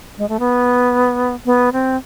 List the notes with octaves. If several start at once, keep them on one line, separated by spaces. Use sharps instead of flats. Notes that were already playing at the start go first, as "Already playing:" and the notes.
G#3
A3
B3
B3
C4